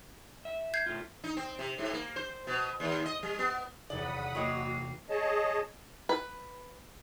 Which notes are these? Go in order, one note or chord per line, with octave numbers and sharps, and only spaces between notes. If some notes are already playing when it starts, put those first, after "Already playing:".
E5
G6 G#6 C7
A3 F4
D#4
C4
C3
G#2
A#3
C5
B2
D#2
D#5
G3
B3
D#1 E2 C3 F#3 D5 F#5 B5 D#6
F#3 A#3 F#4 C#5 D#5 G5
G#4 C#5 D#5 A5
B4